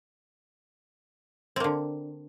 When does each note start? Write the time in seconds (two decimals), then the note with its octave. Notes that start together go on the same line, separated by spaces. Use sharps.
1.56 C4
1.60 A#3
1.64 D3